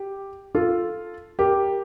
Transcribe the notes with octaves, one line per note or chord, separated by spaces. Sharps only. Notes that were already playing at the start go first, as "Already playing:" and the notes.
Already playing: G4
F4 A4
G4 A#4